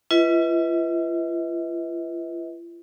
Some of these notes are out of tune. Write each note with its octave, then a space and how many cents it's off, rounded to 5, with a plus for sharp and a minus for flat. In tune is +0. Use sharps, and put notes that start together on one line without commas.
F4 -45 B4 +0 D#5 +45